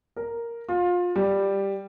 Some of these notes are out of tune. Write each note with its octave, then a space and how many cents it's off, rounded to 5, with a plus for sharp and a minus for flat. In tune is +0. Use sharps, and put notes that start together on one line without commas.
A#4 +0
F4 +25
G3 +5